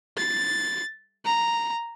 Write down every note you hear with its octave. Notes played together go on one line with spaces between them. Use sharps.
A6
A#5